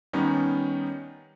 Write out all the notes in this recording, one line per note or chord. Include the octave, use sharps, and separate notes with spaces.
D#3 G3 B3 C#4 D#4